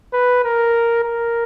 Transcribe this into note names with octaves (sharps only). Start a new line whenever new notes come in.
B4
A#4
A#4